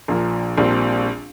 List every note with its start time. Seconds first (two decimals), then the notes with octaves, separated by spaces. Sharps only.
0.08 A#1 A#2 F3 A#3
0.58 A#1 A#2 G3 C4